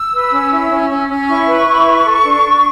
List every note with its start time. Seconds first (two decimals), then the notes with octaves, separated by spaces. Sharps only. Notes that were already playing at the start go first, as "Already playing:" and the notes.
Already playing: E6
0.13 B4
0.31 C#4
0.51 E4
0.70 C#4
0.90 C#4
1.08 C#4
1.28 E4 C#6
1.48 B4
1.67 E4
1.86 B4
2.05 A4
2.24 D4
2.43 D4